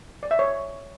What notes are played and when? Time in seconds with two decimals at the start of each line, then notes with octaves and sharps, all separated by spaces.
0.23 D5
0.31 E5
0.39 C#5